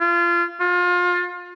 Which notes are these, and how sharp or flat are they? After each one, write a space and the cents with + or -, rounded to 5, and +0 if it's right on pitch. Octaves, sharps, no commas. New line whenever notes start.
F4 -25
F4 +30